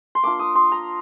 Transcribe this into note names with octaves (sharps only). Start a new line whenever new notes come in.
C6
A#3 D4 F4 D6
D#6
C6
A#5